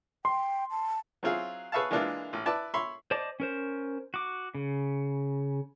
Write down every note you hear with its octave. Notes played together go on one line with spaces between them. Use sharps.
G5 C6
A5
F#3 C4 E4 F4 G#4
G#4 B4 C#5 E5 F5 A5
E3 G#3 A#3 D4 E4 F4
A1
E4 B4 D5 A5
C#5 E5 B5 C6
C5 D5 D#5 A5 D6
C#4 A#4 C5
F#4 D6
C#3